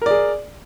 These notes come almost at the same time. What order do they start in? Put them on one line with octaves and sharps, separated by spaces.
A#4 D5 G#4